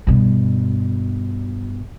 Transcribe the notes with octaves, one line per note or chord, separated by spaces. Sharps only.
G2 B2